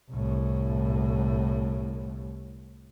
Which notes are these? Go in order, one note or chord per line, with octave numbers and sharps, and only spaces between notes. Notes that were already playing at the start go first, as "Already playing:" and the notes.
C2 A2